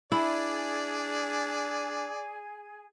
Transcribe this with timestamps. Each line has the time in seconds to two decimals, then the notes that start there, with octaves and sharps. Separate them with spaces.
0.12 D4 E4 G#4 D5 G#5